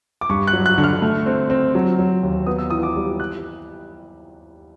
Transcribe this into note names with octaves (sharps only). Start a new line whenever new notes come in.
D6
G2 C#6
F#6
F#3
F#6
D3
F6
A3
C4
C4
F#3
F#3
D#2
B3 D#6
E6
E3 D#6
D6
G3
F#6